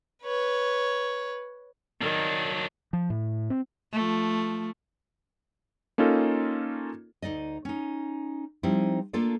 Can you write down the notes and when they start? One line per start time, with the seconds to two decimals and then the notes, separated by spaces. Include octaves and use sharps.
0.23 B4 C#5
2.01 D#3 F#3 D4
2.93 F3
3.10 A2
3.50 C4
3.92 F3 A3
5.98 A#3 C#4 D#4 F4 A4
7.22 D2 D#4 D5 D#5
7.65 C#4 D#4
8.63 F3 G3 C4 D#4 E4
9.13 A3 A#3 D4 F4 A4 D5